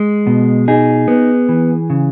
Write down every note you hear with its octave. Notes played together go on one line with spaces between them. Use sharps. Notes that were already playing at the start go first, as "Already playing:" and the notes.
Already playing: G#3
B2
D#4 G#4
B3
E3
C#3